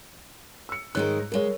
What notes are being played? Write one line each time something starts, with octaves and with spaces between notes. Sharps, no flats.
E6 C#7
G#2 D#3 G#3 A#4 C#5 F#6
D2 G#3 A#4 C#5